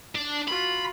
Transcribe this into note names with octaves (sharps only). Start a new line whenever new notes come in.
D4
F4 F#4 B5